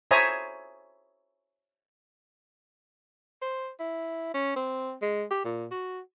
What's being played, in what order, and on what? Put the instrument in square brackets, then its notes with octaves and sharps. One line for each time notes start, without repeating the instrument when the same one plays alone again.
[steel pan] C5 C#5 E5 G#5 A#5 D#6
[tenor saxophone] C5
E4
C#4
C4
G#3
G4
A#2
F#4